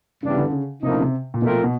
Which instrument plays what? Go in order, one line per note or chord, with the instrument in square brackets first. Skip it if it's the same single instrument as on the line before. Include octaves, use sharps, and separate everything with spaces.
[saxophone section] G2 E3 G3 B3 D4 [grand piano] C#3
[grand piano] D3
C#3
[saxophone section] A2 F3 A#3 D#4 [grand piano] C3
[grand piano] C#3
C3
A#2
[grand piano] B2 [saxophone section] F3 A3 C4 F4 A#4
[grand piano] B2